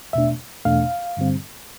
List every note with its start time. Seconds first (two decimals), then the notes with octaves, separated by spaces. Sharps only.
0.13 E2 B2 A3 D4 E5
0.65 E2 B2 A3 D4 F5
1.17 G2 D3 G3 C4